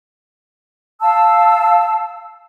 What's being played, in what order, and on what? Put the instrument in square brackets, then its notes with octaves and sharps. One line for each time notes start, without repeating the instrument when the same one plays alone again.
[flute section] F5 A5 E6